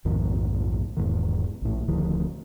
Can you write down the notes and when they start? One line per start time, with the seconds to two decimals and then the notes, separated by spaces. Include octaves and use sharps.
0.05 A#1 F2 G#2 D#3
0.97 E1 E2 G#2 D#3
1.62 A#1 A2
1.88 D1 D2 D#3 F3